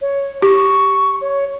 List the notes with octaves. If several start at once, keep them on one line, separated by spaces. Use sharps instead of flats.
C#5
G4 C#6
C#5